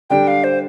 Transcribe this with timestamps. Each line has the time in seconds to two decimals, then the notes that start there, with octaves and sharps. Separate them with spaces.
0.10 D3 G3 D4 G4 G5
0.28 F5
0.44 C5